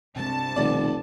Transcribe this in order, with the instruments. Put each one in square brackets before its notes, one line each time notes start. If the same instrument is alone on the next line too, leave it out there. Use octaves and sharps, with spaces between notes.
[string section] C2 A5 [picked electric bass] G2 C3
[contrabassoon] F1 [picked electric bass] B2 D#3 [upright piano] D5